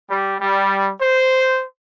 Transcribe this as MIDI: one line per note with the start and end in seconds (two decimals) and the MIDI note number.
0.10 0.35 55
0.41 0.91 55
1.01 1.65 72